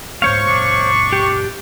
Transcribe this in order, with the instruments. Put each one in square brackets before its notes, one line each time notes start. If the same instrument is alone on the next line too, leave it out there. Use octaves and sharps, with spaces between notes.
[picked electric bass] G#2 G#3 B3 [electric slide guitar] C5 C#5 F5 [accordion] C#6
[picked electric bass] F#2 A#2 [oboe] D4
[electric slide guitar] G4